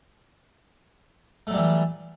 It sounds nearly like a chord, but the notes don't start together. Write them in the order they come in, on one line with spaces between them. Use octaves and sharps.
A3 F#3 G3 E3